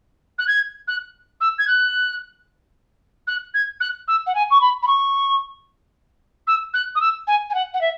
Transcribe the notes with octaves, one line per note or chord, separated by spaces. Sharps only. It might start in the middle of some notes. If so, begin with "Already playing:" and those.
F#6
G#6
F#6
E6
G#6
F#6
F#6
G#6
F#6
E6
F#5
G#5
C#6
B5
B5
C#6
E6
F#6
D#6
E6
G#5
G#5
F#5
F#5
E5